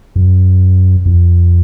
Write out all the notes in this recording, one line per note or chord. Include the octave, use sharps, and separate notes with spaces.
F#2
F2